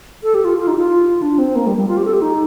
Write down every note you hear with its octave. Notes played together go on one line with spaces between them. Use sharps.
A4
G4
F4
F4
D#4
G4
F4
D4
C4
A#3
G3
G3
F4
G4
A4
G4
D#4